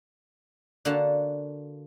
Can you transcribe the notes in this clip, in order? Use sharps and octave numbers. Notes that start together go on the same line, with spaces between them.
D3 A#3 F#4 F5 F#5 A5